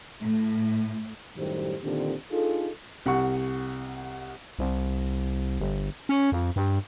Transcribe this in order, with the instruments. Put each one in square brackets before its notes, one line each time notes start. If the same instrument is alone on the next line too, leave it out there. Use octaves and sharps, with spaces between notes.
[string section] A2
[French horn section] F#2 A2 D#3 G3 G4 C5
A#2 D3 D#3 C4 D4 G4
D4 D#4 F4 G#4 A4
[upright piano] C2 F#5 C#6
[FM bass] C2
G1
C#4
F2
G2